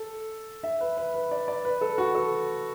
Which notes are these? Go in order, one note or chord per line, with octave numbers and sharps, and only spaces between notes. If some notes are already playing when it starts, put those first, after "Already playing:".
Already playing: A4
E5
B4
B4
B4
D5
D5
B4
A4
F#4
A4